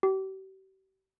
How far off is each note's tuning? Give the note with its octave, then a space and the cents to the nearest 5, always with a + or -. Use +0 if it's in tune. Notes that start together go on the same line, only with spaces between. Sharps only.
G4 -40